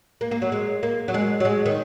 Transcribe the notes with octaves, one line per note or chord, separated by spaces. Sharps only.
A#3
A#3
F#3
G#3
A#3
F#3
G#3
F#3
G#3
D#3